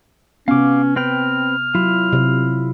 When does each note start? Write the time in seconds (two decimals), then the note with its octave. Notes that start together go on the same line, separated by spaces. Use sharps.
0.48 C3 B3 C#4 F5 D6
0.96 C4 B4 G5 F6
1.75 F#3 E4 F4
2.13 C3